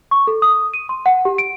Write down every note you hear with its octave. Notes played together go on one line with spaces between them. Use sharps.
C#6
A4
D#6
D#7
C6
F#5
G4
D7